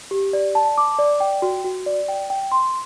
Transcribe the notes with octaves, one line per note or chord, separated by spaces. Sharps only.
G4
D5
A5
D6
D5
G5
F#4
F#4
D5
G5
G5
C6